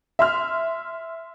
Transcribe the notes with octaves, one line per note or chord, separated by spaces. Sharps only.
E5 C6 F6